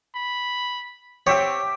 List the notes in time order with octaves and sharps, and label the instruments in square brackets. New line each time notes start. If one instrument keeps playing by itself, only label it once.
[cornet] B5
[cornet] C4 [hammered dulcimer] G4 E5 G5 [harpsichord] C#5